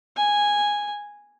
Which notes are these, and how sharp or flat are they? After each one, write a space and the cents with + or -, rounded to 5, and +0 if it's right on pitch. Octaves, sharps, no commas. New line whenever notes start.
G#5 -5